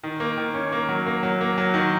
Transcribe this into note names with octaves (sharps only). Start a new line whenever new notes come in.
D#3
A#3
D#3
C#4
A#3
F#3
A#3
F#3
A#3
F#3
D#3